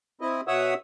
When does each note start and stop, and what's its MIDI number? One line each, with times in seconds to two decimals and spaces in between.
0.21 0.41 60
0.21 0.41 64
0.21 0.41 75
0.48 0.74 47
0.48 0.74 73
0.48 0.74 76
0.48 0.74 78
0.48 0.74 87
0.48 0.74 88